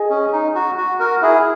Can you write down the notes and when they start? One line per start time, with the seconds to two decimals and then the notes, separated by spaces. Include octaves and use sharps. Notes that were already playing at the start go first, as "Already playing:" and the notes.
Already playing: G#4 D#5 G#5
0.10 C#4
0.32 D#4
0.55 F#4
0.78 F#4
1.00 F#4 A#4
1.22 E4 G#4